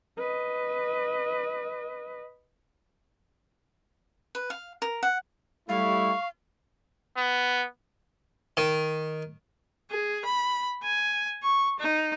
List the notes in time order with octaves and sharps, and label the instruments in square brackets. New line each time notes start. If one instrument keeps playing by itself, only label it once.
[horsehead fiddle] B4 D#5
[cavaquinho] B4
F5
A#4
F#5
[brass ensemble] G3 A3 E4 [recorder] F5 [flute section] C#6
[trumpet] B3
[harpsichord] D#3
[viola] G#4
B5
G#5
C#6
D#4